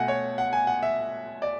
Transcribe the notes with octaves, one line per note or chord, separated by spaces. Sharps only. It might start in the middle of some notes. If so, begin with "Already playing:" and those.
Already playing: B2 A3 F#5 G#5
C#5
F#5
G#5
F#5
E5
D5